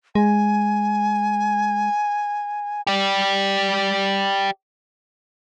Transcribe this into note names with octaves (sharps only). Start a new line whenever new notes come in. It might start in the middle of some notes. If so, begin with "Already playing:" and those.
G#3 G#5
G4 D5